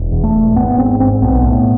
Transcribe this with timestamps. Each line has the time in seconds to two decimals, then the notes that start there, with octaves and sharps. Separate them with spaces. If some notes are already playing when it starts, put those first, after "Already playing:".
Already playing: E1
0.12 E2
0.24 A3
0.34 E1
0.56 G#1 B3
0.78 G#2 C4
1.00 G#1 C4
1.22 B1 B3
1.44 A2